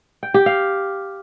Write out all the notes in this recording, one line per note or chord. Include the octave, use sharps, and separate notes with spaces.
G5
G4
F5